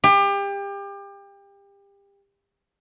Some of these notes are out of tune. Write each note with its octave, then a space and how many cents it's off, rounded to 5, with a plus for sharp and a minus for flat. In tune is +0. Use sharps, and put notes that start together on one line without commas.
G4 +30